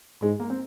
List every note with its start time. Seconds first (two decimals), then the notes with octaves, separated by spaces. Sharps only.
0.22 G#2 G#3
0.40 A#3
0.50 C4